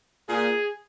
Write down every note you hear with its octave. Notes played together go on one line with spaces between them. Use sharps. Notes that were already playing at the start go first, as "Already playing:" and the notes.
A#2 G#4